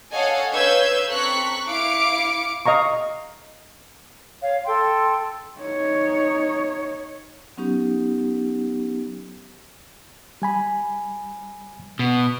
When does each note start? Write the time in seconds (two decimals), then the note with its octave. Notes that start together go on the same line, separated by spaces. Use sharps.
0.13 A4 C#5 D#5 F5 F#5 G#5
0.54 B4 C#5 F5 E6 G6 G#6
1.10 C4 A4 A#5 C#6 F#6 B6
1.68 E4 F5 D6 C#7 D7
2.66 D#5 F5 A#5 C#6
4.42 C#5 F5
4.67 A4 G5 C6
5.61 D#4 C#5
7.57 F#3 B3 C#4 D#4 G4
10.42 G3 G#5 B5
11.99 B2